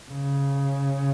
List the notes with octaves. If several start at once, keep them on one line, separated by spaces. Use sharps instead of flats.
C#3